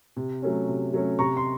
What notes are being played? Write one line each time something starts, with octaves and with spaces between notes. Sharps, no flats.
C3
F#3 A3 C#4
C3
F#3 A3 C#4
C3 A#5 C#6
C6